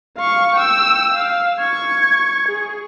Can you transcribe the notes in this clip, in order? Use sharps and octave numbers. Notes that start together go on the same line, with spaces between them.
F5 C#6
G5 E6
F5
C#6 G#6
G#4